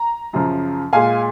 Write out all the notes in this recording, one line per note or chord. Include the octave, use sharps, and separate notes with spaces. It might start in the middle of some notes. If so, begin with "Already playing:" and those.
Already playing: A#5
F#2 C#3 F3
A#2 G#3 F5 G#5